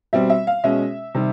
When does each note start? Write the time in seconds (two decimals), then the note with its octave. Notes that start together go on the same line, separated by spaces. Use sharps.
0.13 B2 G3 C4 E5
0.30 E5
0.47 F5
0.64 B2 G#3 C#4 E5
1.15 C3 D#3 G3